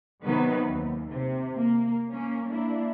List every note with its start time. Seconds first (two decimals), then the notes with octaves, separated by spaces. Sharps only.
0.24 C3 D#3 F#3 B3 B4
0.66 D#2
1.10 C3
1.55 A#3
2.09 A#3 C#4
2.48 A#3 D4 E4